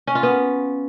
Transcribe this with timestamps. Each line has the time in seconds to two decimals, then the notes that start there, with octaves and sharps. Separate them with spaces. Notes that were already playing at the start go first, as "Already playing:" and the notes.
0.07 C#4
0.15 F4
0.23 B3